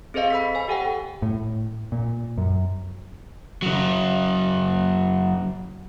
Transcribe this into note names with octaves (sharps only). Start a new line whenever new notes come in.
C4 G#4 A4 C5 D#5 F5
B5 E6 B6
C5 G#5
G4 A4 F#5 G5
A2
A#2
F#2
C#3 F#3